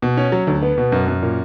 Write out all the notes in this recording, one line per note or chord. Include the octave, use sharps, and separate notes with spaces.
B2
C#4
F#3
D2
B3
B2
F#2
F#2
A#2